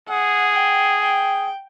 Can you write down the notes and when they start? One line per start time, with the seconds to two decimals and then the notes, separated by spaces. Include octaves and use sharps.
0.08 G#4 F#5
0.55 G5
1.01 G5